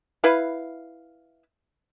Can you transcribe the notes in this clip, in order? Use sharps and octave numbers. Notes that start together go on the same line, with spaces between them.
E4 B4 F5